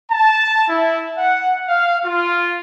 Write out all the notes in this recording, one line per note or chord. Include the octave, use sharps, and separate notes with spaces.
A5
E4
F#5
F5
F4